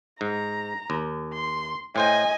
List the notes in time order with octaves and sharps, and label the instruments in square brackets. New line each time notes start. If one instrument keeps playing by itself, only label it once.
[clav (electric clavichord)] G#2 [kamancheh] A#5
[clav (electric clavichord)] D#2
[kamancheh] C6
[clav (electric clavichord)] A2 C5 G5 [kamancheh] D#5 G#5